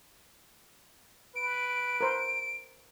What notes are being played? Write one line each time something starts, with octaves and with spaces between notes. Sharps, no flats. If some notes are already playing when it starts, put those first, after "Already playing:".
B4 D7
A#4 C5